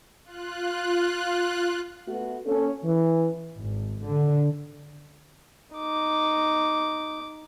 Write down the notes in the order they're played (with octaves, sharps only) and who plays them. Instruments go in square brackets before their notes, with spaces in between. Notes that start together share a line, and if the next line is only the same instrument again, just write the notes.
[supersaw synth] F4 F#6
[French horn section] A3 B3 F#4
A#3 C#4 A4
E3
[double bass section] G#1
D3
[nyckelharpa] D#4 D6